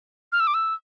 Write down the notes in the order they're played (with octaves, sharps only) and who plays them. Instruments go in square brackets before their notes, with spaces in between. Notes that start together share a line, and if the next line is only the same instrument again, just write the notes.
[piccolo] F6
E6
D6
E6